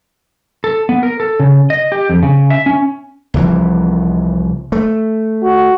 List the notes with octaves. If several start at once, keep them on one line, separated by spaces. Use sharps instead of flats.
A4
B3
A#4
A4
C#3
D#5
G4
F2
C#3
E5
C#4
C2 E3 F3
A3
F#4